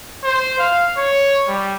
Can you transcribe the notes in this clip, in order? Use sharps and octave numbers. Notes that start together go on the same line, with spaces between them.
C5
F5
C#5
G3